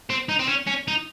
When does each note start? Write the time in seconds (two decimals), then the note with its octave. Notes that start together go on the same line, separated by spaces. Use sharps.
0.10 C4
0.29 D#4
0.39 C4
0.49 C#4
0.67 C#4
0.88 D#4